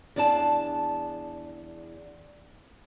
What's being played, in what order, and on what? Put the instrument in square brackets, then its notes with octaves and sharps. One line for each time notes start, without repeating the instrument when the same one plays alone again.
[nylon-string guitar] E2 D4 D5 F5 A5